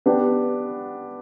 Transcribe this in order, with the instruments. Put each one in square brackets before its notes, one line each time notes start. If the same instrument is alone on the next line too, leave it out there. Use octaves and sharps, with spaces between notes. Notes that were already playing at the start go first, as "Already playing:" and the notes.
[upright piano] B3 D4 G4